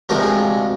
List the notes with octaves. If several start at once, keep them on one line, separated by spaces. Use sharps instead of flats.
D2 C3 F3 G#3 A#4
G#4